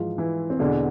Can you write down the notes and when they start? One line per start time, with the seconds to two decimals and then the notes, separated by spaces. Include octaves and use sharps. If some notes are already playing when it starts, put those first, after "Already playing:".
Already playing: G#2 E3 F3 F4
0.18 E3 E4
0.50 C4
0.59 E2 B2 D3 D4